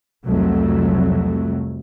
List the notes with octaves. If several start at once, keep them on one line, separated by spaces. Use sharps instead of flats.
C2 F2 F#3 A3